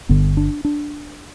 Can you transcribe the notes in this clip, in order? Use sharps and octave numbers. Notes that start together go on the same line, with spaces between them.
G1 G2 D3 B3
D4
D4